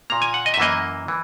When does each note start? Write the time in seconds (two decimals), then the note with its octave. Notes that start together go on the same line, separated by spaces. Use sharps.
0.10 A#2 A#3 A#5
0.22 G#5
0.34 F#5
0.46 D#5
0.54 E5
0.58 F#2 E3 A#3 D#5
1.08 E3